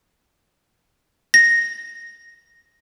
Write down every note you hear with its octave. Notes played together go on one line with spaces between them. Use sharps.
A#6